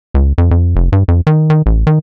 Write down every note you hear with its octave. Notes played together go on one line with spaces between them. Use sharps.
C#2
F2
F2
F1
G2
F2
D#3
D#3
A1
D#3